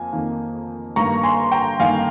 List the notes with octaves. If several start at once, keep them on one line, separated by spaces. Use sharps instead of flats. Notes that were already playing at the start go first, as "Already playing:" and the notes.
Already playing: F2 A#3 G#5
F2 D#3 A#3
G2 D#3 A#3 A#5 C#6
G#5 C6
G5 A#5
G2 D#3 A#3 F5 G#5